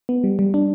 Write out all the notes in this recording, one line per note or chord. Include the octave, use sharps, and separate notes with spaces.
B3
G3
G3
D4